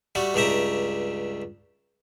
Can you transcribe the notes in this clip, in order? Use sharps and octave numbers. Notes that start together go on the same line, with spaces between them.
G3 A3 F#4
C#2 G2 C#3 G4 E5 A#5